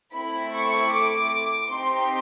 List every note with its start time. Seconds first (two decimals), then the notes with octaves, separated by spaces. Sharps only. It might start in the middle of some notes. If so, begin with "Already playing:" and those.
0.14 A3 C4 E4 B5
0.53 C#6
0.93 D6
1.70 C4 D#4 G4 C6